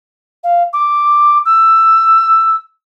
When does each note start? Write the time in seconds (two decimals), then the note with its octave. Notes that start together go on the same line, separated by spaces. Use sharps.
0.43 F5
0.73 D6
1.45 E6